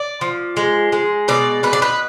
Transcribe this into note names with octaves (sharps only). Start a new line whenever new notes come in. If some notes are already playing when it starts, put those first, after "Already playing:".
Already playing: D5
F3
G#3
G#3
B2 D5
B2 B4
D5
B4